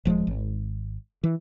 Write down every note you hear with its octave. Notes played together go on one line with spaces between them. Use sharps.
D#1 F3 F#3 G#3
G#1
E3